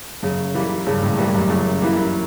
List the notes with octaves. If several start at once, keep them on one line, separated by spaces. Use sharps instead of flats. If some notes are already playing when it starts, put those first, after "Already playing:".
F#2 C#3
E3 G3 A#3
G2 C#3
A2
G2 E3 G3 A#3
F#2
F#2 C#3
E3 G3 A#3